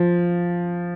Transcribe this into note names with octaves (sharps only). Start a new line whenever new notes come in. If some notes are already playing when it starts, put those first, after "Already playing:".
Already playing: F3